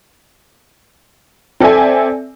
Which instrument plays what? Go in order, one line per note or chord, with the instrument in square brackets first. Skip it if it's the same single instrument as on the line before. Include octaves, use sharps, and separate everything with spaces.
[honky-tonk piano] C4 A4 D5 E5 G#5